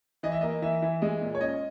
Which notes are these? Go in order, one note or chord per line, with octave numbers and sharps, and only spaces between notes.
E3 D#5
E5
A#3 D#5
E3 E5
E3
G#3 D#5
A#2
C#5
C#4 D#5